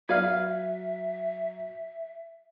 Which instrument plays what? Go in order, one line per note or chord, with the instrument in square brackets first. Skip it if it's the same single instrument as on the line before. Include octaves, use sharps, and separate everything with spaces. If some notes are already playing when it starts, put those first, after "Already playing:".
[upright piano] F#3 [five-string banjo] B4 D5 F5 [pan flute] E5 [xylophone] F6 G#6